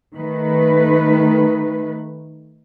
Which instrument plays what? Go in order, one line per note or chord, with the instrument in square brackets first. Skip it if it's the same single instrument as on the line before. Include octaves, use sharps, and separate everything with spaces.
[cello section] D#3 A3 B4